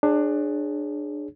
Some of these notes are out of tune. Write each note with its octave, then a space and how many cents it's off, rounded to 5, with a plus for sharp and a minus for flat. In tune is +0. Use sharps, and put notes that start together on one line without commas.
D4 +20 G#4 +0 C#5 -15